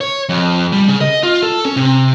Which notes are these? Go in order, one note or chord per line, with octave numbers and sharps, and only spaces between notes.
C#5
F2
G3
C#3
D#5
F4
A4
C#4
C3